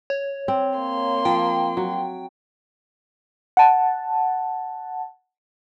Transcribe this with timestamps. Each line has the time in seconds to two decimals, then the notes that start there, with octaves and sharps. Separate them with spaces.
0.10 C#5
0.48 C4
0.78 A#3 C6
1.25 F3 G5
1.77 F#3
3.57 F#5 A5